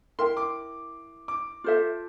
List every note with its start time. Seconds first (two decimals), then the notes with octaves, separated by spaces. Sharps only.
0.19 E4 A#4 E5 G5 C6
0.37 D6
1.28 D6
1.64 F4 A4 C5 E5